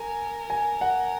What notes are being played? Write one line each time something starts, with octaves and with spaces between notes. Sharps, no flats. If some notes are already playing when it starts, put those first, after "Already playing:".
Already playing: A#4 G#5
G#5
F#5